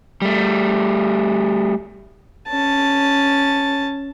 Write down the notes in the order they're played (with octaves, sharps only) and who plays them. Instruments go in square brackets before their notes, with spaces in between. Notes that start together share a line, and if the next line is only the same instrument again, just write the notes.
[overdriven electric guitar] G3 A3
[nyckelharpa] C#4 A5